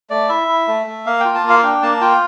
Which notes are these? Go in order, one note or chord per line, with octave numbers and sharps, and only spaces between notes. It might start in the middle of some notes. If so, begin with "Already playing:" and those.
A3 D5
E4 E5
E4
A3
A3
A#3 F5
F4 G5
A5
A#3
F5
D4 G5
A#3 A5
F4 G5